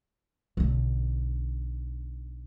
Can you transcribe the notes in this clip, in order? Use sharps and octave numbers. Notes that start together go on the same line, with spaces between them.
B1 D3